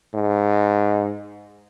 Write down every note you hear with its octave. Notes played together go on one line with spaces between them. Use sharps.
G#2